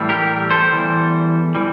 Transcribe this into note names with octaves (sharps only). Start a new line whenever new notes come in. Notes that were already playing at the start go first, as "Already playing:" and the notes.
Already playing: A2 E3 G3
G4 A#4
A4 C5
E2 E3 G3
E3 G3